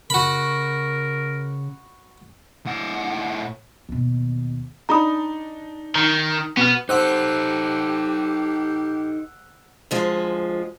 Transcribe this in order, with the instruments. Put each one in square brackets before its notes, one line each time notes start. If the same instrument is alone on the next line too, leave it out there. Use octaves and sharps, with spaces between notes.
[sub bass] C#3 [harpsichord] F#4 B5 [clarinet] A#4
[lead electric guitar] A2 F#5
[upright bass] D#2 B2
[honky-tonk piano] D4 D#4 [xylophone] A#5 B5 D#6
[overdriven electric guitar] D#3 [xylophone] A#5
[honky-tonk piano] B2 F6 [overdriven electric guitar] B3
[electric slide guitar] D#4 A4 [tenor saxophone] G4 [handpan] C5 [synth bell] F#5 E6 F#6
[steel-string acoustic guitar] D2 F3 G#3